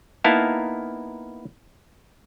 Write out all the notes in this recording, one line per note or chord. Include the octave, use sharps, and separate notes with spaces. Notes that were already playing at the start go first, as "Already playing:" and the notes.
A#3 B3 D#4 E4 F5 A5